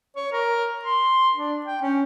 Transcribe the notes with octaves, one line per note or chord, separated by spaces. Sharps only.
C#5
A#4
C6
D4
G5
C#4